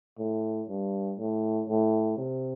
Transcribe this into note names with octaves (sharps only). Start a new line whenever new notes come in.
A2
G2
A2
A2
C3